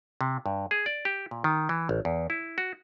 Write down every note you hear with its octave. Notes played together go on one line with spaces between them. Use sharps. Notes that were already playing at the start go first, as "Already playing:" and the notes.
C3
G2
G#4
D5
G4
A#2
D#3
E3
A1
E2
E4
F#4